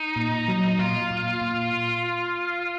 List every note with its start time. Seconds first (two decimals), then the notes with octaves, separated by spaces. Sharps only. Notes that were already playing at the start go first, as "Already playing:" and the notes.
Already playing: D#4
0.16 A#2
0.48 F#3
0.79 A#2 F4
1.11 A#2
1.42 A#2